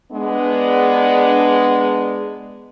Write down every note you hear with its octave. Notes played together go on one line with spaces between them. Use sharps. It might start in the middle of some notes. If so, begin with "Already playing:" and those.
G#3 B3 D4